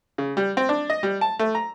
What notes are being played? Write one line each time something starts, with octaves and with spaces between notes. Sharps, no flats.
C#3
G3
C4
D4
D#5
G3
A5
A3
A#5